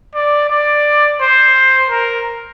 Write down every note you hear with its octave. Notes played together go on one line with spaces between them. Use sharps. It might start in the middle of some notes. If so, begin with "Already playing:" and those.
D5
D5
C5
A#4